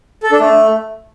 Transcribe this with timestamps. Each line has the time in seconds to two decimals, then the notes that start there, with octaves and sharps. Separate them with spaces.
0.23 A4
0.32 D4
0.40 A3